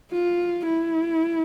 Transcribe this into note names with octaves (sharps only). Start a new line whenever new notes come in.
F4
E4